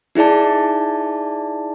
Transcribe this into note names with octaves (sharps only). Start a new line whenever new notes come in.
D#4 E4 G#4 D5 A5